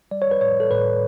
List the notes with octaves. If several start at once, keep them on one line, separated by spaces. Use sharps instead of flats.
G3 D5
C#5
B4
A2 C#5
A4
A2 B4